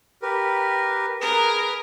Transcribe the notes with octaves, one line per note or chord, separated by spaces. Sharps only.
G4 A#4 B4
G#4 A#4 B4